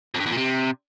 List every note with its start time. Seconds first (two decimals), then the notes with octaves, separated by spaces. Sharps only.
0.15 F2
0.20 G2
0.26 E2
0.32 A#2
0.37 C3